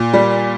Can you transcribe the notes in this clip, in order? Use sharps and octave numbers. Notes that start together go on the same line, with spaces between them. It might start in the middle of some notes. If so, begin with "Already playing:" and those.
Already playing: A#2
G3